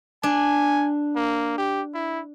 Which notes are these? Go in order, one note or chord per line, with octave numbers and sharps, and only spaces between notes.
D4 G#5
A#3
G4
E4